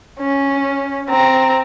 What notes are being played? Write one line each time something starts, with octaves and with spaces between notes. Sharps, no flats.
C#4
C4 A#5